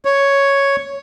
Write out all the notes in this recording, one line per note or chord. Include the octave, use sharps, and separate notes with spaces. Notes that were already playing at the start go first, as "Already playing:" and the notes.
C#5